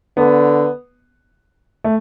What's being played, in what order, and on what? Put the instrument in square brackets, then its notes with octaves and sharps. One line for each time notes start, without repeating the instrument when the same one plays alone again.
[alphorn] D3 [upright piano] B3
[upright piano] A3